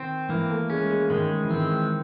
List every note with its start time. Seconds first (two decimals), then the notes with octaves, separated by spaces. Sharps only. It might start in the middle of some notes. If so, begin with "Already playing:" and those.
Already playing: D#3 C4
0.29 E3 A#3
0.50 A3
0.70 G#3 C#4
0.90 G#3
1.10 D#3 G#3
1.45 E3
1.51 D#3 C4